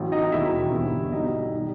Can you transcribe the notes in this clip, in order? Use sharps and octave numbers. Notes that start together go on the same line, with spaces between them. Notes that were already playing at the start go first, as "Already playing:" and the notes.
Already playing: A1 A2 F#3
D#4 D#5
E1 D#2 D#3 F#3 E4 E5
G1 G2 E3
B1 B2 G3 D#4 D#5
D#3 G3